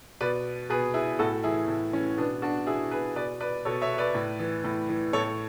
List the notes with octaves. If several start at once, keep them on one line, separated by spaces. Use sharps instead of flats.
B2 B4 D5
B2 G#4 B4
E4 G#4
A2 F#4 A4
E3 E4 G#4
A2
E3 C#4
B2 B3 D4
D4 F#4
B2 E4 G#4
G#4 B4
B2 B4 D5
B4 D5
B2 A4 C#5
C#5 E5
B4 D5
A2
E3
A2
E3
A2 A4 C#5